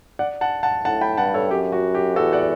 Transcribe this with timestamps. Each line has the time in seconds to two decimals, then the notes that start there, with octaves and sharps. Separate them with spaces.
0.19 D5 F#5
0.41 F#5 A5
0.63 F#5 A5
0.85 A2 F#5 A5
1.01 G5 B5
1.17 G2 F#5 A5
1.34 A4 C#5
1.51 F#2 G4
1.72 F#4
1.95 G4
2.16 E2 F#4 A4
2.33 D5 F#5